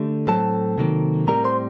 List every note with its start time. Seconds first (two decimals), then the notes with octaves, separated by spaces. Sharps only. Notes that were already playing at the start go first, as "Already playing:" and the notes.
Already playing: D3 A3 G4
0.27 A2 F#3 C4 A4 A5
0.78 C3 D#3 F#3 A#3
1.27 A2 G3 C4 A#4 A#5
1.44 C5 C6